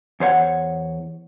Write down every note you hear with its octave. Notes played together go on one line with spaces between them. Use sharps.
E2 C5 C#5 F#5